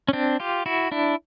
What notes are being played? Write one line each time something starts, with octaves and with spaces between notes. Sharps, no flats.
C#4
C4 D4
F4 G4
E4 F#4
D4 E4